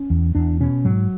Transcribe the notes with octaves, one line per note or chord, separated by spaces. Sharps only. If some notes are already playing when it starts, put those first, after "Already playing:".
Already playing: C#4
E2
E2 D4
B2 C#4
G#2 F#3